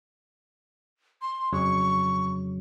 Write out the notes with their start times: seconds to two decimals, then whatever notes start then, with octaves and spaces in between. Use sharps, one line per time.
1.21 C6
1.53 F2 C#3 F#3 C#6